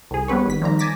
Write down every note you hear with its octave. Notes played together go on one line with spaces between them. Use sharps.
C2 G#4
G3 B3 C4 B4 C#5
G#1 B6
D#3 F3 G3 A#5
G#5 A5 D6 A#6 B6